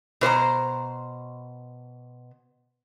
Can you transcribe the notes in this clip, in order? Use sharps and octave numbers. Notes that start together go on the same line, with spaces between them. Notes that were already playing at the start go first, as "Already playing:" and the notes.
B2 C5 C#5 A#5